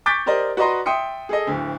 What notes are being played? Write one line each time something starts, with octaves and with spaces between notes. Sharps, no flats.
C#6 D6 G6 A6 B6 D7
G4 A#4 C5 D5 D#5
F#4 B4 D5 D#5 A#5 C6
E5 G5 C6 D#6 C#7
G#4 A4 D#5
D1 D2